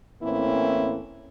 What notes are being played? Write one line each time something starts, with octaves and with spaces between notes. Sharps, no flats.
A2 E3 A#3 C4 C#4 E4